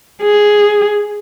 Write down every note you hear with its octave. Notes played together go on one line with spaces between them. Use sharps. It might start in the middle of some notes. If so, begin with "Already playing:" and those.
G#4